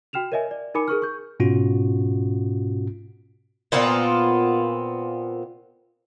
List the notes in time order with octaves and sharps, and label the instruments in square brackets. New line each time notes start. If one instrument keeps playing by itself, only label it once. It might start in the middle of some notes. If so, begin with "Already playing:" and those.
[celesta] F#4 G5 F6 E7 F7
A#4 C#5 D#5 E5 G#5
D5
D#4 A#4 G#5 B5 D6 C#7
G#4 A#4 C#6 F6
C#6 G6
[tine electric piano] G#2 B2 C#4 F4 F#4
[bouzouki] A#2 B3 C4 F4